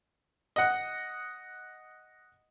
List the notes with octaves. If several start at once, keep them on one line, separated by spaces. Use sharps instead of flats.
D#5 F#5